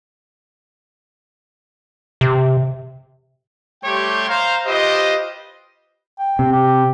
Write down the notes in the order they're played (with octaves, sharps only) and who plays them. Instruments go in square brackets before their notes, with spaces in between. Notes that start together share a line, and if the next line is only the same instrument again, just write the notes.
[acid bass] C3
[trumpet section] G3 A3 G4 C#5 G5 C6
C5 F5 A#5
F4 G4 B4 C5 D#5
[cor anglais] G5
[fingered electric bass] C3
[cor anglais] G4